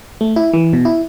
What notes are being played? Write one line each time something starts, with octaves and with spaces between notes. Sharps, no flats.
A3
E4
E3
B2
E4